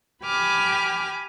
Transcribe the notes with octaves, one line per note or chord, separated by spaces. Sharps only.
G4 G#5 B5 D6 F6